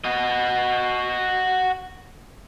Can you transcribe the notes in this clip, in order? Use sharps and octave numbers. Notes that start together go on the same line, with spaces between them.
F#4 D#5